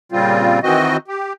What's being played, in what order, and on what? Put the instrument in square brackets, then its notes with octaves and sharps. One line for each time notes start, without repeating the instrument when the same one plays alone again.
[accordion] A#2 C#3 G3 C4 F4
D#3 E3 C4 F#4 D#5
G4